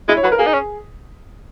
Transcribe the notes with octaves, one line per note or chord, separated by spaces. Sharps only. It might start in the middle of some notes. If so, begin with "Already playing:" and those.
G#3 E4
C#5
F#3 B4
A#4
A#3 G#4
D#4
C#4